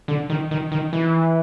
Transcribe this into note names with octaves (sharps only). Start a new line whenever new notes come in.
D3
D#3
D#3
D#3
E3